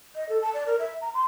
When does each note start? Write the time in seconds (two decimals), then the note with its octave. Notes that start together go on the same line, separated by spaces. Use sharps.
0.15 D#5
0.29 A4
0.42 A5
0.54 D5
0.67 A#4
0.79 E5
1.01 A#5
1.14 C6